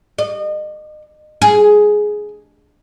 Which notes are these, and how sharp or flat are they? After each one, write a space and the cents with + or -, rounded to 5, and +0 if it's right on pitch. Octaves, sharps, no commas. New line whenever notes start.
D#5 -35
G#4 +10